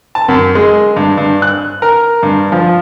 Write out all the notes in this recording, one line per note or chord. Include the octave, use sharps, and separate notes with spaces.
A5
F#2
G#3
G2
G2
F#6
A#4
G2
F3